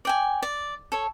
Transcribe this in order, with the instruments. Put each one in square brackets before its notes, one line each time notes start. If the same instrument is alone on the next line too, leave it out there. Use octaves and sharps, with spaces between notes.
[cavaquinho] D5 G5 G#5
D5
A4 C#5